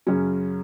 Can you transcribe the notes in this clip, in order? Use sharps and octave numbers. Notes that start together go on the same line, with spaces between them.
F#2 C#3 F#3 C#4